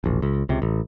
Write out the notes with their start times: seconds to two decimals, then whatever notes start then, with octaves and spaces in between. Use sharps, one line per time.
0.04 E1 A#1
0.22 C#2
0.49 C#2 C3
0.62 A1